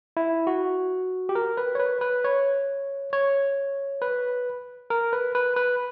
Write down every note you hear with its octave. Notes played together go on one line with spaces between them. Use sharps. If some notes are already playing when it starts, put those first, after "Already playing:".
E4
F#4
G4
A#4
B4
C#5
B4
B4
C#5
C#5
B4
A#4
B4
B4
B4